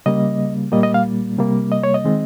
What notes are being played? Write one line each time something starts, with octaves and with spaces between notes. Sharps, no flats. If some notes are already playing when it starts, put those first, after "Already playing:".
C#3 G3 A#3 D#5
A#2 G3 A#3 D#5
D#5
F5
C3 G3 A#3
D#5
C#5
D#5
D#3 G#3 C4